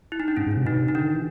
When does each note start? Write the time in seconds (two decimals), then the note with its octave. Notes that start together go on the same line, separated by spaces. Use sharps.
0.12 E4
0.20 D#4
0.28 D4
0.37 G#2 C#4
0.47 G#2
0.51 C#4
0.57 C3
0.65 B2 D#4
0.80 C3
0.88 D#4
0.95 D3 D4
1.04 D#3
1.14 E3